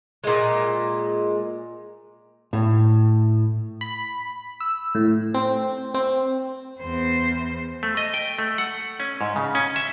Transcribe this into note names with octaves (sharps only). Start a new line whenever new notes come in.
A#2 G#3
A2
B5
E6
A2
C4
C4
E2 C5
A3
D#5
G5
A3
F#5
C#4
G#2
C#3
C#4
E5